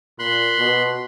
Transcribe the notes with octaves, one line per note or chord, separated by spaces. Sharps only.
A#2 B5 C6 F#6
B2